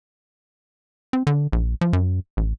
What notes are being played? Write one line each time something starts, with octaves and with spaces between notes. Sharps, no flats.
C4
D3
A#1
F3
F#2
A1